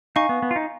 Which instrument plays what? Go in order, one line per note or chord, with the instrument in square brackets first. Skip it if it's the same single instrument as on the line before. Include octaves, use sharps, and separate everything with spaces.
[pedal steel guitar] D#4 [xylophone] F5 G#5 C#6
[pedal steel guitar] B3
B3
F4
D#4